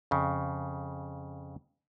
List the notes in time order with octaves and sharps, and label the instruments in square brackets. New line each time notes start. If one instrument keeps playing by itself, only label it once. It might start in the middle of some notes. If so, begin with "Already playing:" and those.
[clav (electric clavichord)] F2 C#3